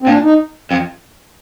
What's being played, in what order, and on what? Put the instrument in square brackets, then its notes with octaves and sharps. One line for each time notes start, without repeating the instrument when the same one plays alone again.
[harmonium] C4
[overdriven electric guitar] A#2 [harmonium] D4
[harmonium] D#4
[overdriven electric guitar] F2